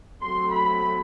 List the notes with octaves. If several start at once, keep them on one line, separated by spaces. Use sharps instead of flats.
F#3 A3 C4 C6
B5